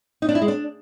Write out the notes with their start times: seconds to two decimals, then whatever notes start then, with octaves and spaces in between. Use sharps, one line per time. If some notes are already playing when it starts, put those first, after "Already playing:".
0.22 D#4
0.29 D4
0.35 E4
0.42 G#3
0.48 D4